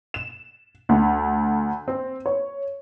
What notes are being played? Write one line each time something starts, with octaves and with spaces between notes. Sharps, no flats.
E7
D2
C4
C#5